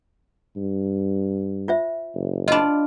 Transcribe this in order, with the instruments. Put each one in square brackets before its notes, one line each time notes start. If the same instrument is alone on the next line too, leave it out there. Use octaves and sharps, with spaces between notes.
[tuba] G2
[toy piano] F4 C5 E5
[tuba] F#1
[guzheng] D4 F4 [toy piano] D#5 B5